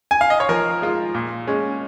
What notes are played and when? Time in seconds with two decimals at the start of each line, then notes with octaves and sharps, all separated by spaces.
0.11 G#5
0.21 F5
0.30 D#5
0.40 C#5
0.49 F3 A#4
0.82 G#3 F4
1.15 A#2
1.47 G#3 C#4